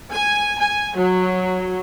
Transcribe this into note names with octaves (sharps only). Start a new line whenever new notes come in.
G#5
G#5
F#3